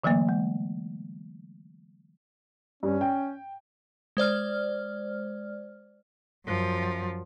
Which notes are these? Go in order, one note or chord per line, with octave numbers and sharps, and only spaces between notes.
D3 E3 F#3 A3 A#3
G#3
G2 C#4
G5
G#3 C5 D5 F6
F#2 F3